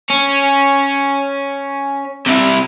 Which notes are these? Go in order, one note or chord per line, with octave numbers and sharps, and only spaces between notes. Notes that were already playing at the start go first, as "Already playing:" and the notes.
C#4
C3 E4